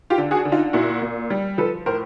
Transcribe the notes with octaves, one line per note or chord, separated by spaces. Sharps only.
F4 G4
D3
F#4 G#4
D3
D#4 F4
A#2 E4 F#4
A#2
G3
F3 A4 B4
A2 A#4 C5